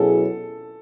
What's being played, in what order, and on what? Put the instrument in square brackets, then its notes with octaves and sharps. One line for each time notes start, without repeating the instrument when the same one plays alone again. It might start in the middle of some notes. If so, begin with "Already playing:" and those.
Already playing: [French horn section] B2 F#3 C#4 E4 G#4 [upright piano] A4